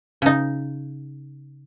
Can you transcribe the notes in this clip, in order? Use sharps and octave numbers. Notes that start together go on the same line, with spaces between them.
C#3 D#4